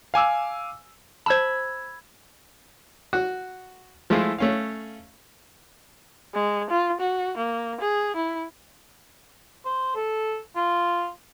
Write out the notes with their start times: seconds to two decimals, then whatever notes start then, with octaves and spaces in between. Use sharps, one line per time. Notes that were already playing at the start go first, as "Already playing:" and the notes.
0.14 F5 G#5 D6 E6
1.26 C5 A5 B5 E6 G#6
3.13 F#4 F#5
4.10 F3 G#3 A3 E4 F4
4.38 A3 C#4 F5
6.34 G#3
6.70 F4
7.01 F#4
7.37 A#3
7.81 G#4
8.16 E4
9.65 C5
9.95 A4
10.56 F4